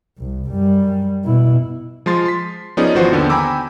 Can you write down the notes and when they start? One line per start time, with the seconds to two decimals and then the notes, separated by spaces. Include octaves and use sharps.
0.19 C2
0.49 F#2 G3
1.25 B2 E4
2.06 F3 G#3 C6 A6
2.26 C6 B6
2.77 F3 B3 C#4 D#4 G#4 D5
2.95 G#1 E3 F3 F#4 C5 F#5
3.12 D#2 D3 B3
3.29 G5 G#5 A#5 B5 D6 E6